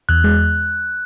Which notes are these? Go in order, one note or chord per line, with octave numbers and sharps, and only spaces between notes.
E2 F#6
G#3